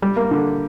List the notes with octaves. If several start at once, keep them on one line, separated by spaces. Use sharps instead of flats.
G3
A#3
D3